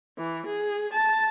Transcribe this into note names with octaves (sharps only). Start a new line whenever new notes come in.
E3
G#4
A5